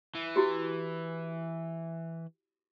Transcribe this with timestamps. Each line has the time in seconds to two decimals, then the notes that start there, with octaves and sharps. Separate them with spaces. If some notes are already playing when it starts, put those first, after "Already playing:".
0.15 E3
0.36 E4 F#4 G4